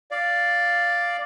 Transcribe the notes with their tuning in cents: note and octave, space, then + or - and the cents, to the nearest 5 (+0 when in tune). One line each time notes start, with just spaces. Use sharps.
D5 +0 F5 +0